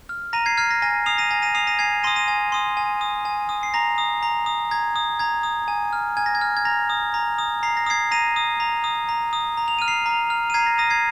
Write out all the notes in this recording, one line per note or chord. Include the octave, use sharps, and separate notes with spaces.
F6
A#5 A#6 D#7
G#6 C7
F6 G#6 C7
A#6
G#5 A#6
D#6 C7 F7
A#6 D#7
G#5 A#6
A#6 D#7
D#6 C7 F7
A#6 D#7
G#5 G#6 C7
C6 D#6 A#6 D#7
A#6 D#7
G#5
C6 D#6
G#5
D#6
G#5
D#6
C7
A#5 A#6
D#6
A#5
D#6
A#5 G#6
D#6
A#5 G#6
D#6
G#5
F6
G#5 G#6
A#6
G#6
F6
G#6
A#5 A#6
D#6
A#5
D#6
A#5 C7
A#6
D#6 G#6 C7
A#5 A#6 D#7
D#6
A#5
D#6
A#5
D#6
A#5
F7
F6 D#7
C7 F7
A#5
F6
D#7
A#5 G#6 C7
A#6
D#6 A#6 D#7
G#6 C7